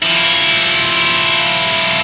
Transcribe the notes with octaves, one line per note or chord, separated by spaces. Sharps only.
F3 E4